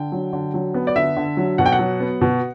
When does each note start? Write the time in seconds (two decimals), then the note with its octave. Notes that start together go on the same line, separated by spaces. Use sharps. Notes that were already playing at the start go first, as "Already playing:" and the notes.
Already playing: D3 G5
0.12 F#3
0.33 D3
0.54 F#3
0.74 B3
0.87 D5
0.96 D3 E5
1.16 D3
1.37 F#3
1.58 B2 F#5
1.66 G5
1.72 F#5
1.79 F#3
2.00 B3
2.21 B2